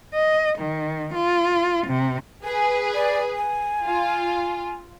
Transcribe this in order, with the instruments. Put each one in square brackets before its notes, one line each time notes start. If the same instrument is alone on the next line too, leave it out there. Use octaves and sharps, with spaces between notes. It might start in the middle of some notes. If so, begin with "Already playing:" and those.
[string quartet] D#5
D#3
F4
C3
[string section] G#4 B4 [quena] G#5
[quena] D5
G#5
[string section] F4